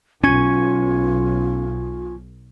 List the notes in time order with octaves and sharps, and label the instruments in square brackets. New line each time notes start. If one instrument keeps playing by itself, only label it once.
[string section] B1 [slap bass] C#4 [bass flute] F4 [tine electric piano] G#5 C#6 G#6